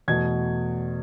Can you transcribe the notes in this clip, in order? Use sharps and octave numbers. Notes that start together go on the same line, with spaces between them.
E2 B2 A3 G#6